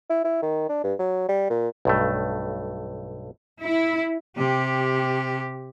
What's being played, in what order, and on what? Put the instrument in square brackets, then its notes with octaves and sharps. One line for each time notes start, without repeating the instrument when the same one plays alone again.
[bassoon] E4
E4
D#3
D4
G2
F#3
G3
A#2
[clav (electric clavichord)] B1 G2 A3
[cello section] E4
[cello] C3 G4